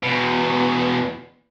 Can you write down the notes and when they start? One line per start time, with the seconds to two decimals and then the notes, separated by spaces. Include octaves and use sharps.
0.03 E2 B2